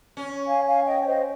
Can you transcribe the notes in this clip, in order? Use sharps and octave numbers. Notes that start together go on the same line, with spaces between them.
C#4
F5 G#5
F5 G#5
D#5 G5
C#5
C5 D#5